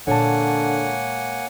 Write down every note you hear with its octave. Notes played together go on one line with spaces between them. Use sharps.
A#2 D3 G#3 A#3 C#5 F#5 G#5 A5